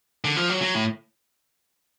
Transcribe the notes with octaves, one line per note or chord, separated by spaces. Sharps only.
D3
F3
F#3
F#3
A2